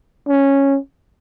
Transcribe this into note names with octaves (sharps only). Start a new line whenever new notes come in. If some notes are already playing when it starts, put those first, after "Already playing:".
C#4